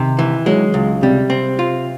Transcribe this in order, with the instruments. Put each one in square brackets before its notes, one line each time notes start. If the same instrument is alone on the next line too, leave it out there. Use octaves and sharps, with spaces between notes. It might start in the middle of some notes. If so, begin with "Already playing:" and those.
Already playing: [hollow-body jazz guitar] C3 [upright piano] D#3
[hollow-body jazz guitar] E3
[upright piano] F#3 [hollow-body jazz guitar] G#3
[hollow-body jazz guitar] C#2
[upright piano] C3 [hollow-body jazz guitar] G3
[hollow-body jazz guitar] C4
F4